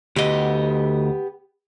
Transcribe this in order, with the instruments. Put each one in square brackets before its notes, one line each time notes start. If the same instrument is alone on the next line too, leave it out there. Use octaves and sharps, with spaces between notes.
[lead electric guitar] D2 D#5 [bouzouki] B3 G4